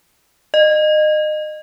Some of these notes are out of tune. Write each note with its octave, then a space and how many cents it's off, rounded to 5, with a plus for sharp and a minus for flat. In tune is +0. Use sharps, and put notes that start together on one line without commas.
D#5 -25